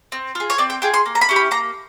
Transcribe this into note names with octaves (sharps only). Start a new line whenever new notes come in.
C4
F4 G#4
C#5
C4 D5
G5
F4 G#4 G5
C6
A#3
A#5
B5
C#4 E4 G4
B5
A#3 A#5